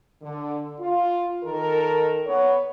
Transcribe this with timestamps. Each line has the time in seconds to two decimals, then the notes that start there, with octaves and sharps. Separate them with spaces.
0.22 D3
0.80 F4
1.44 D#3 A4 A#4
2.27 B3 C#5